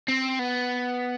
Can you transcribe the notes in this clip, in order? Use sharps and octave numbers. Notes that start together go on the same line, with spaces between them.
C4
B3